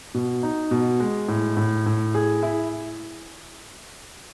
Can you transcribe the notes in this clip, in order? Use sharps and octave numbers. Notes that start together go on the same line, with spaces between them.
B2
D#4
B2
G#3
A2
A2
A2
G#4
E4